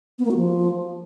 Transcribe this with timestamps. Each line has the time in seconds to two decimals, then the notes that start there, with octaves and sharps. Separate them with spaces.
0.19 B3
0.25 A#3
0.31 F#4
0.37 F3